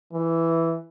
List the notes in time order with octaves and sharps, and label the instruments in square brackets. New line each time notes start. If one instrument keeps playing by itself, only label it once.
[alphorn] E3